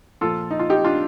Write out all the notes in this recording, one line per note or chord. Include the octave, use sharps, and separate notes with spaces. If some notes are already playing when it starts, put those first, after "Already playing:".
A#2 F3 F4 A4
D#4
F4
D#4 G4
D4 F4